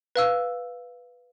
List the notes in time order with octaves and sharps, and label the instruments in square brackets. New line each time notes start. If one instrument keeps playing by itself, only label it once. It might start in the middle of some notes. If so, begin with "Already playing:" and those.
[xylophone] B4 F5 E6